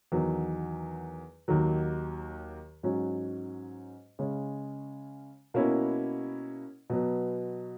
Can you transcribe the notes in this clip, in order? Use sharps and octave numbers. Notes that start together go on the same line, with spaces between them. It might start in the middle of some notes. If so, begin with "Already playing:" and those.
E2 D#3 F#3
D#2 D#3 F#3
G#2 F#3 C#4 F#4
C#3 G#3 C#4
B2 A#3 C#4 E4
B2 F#3 B3